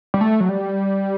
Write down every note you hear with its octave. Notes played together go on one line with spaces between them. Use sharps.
G3
A3
F#3
G3